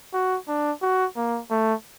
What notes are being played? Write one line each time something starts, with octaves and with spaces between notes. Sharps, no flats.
F#4
D4
F#4
A#3
A3